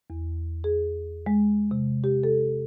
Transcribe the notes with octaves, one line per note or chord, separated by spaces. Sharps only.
E2
G#4
G#3
C3
G4
A4